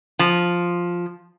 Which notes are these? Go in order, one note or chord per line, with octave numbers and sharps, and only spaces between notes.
F3